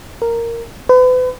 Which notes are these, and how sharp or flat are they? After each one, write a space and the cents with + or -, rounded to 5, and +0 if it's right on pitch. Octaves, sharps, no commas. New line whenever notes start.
A#4 -5
B4 +40